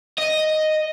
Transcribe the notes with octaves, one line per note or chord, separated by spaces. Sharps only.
D#5